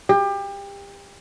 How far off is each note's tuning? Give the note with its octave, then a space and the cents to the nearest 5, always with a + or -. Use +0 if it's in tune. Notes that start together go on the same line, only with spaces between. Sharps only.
G4 +30